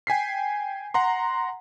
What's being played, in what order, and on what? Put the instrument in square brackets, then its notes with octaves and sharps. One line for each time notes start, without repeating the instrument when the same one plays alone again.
[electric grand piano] G5 G#5 B6 C7
F#5 A#5 C6